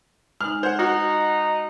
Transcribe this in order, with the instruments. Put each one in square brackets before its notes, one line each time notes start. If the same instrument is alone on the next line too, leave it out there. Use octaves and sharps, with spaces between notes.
[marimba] G#3 D#4 [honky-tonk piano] F6
[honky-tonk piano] C5 F#5 [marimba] G#6
[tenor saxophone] D#4 [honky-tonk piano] F#4